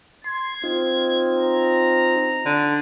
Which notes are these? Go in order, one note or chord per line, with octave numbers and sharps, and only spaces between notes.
C6 G#6
C4 D#4 F4
A#5
D3